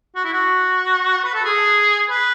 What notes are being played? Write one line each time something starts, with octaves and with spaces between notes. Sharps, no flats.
F#4
E4
F#4
B4
A4
G#4
B4